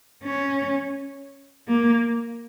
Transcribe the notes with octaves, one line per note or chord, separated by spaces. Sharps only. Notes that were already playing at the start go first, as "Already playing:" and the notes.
C#4
A#3